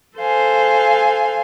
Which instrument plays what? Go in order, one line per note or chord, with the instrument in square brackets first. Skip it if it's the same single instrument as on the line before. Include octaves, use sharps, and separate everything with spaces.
[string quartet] A4 C5 F5 G#5